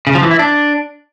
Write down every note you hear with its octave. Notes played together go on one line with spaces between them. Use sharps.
C#3
F3
E3
E4
D4